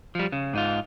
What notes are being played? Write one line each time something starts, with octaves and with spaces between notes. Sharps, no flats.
F3 G3
C#3
G#2 D#4 F4